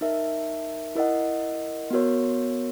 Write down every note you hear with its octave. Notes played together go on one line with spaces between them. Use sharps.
D#4 A#4 E5
E4 A#4 D#5 F#5
B3 F#4 A#4 C#5